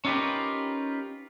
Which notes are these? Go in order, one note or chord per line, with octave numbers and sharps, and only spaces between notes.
C#4 D#4 F4 G4 A#4 B4